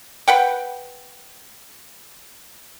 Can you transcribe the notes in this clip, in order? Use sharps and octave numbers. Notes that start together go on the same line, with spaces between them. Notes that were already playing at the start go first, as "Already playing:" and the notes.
B4 F#5 G5